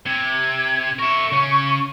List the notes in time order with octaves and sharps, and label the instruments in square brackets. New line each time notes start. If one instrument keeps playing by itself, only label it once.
[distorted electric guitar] C3 [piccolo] G#6
[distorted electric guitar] A#4 E5 [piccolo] C#6
[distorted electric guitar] C#3 C#4